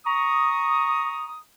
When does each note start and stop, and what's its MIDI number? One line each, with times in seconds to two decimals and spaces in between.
0.06 1.38 82
0.06 1.38 85
0.06 1.38 87